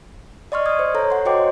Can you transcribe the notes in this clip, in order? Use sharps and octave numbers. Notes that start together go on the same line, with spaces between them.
D5 D#5 C6 C#6 F6
D#6 G#6
C5
A4 C#5 A#5
F#5 C6
F#4 C5 C#5 D#5 G5 D6